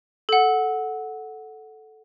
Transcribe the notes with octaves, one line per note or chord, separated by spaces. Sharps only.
A4 F#5